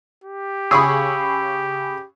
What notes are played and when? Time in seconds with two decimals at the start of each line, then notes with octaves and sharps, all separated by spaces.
0.24 G4
0.71 C#3 G#4 B5 C#6 E6